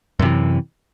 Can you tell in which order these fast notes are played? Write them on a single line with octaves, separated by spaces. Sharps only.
F#2 C3 E3